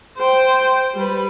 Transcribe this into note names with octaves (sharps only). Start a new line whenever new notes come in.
C5 G5
G3 B4